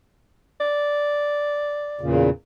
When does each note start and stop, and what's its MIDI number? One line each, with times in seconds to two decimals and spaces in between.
0.61 2.15 74
2.01 2.30 40
2.01 2.30 46
2.01 2.30 49